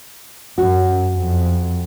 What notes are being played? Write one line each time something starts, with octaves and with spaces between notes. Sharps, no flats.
F#2 F#4
F2